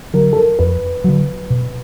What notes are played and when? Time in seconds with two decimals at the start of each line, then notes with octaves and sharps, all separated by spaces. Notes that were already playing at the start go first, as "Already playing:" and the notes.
0.14 D3 F#3 A#4
0.33 A4
0.36 A#4
0.59 F2 B4
1.04 D3 F#3
1.50 B2